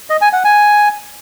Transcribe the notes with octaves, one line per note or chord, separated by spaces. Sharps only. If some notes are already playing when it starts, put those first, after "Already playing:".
D#5
G#5
F#5
G#5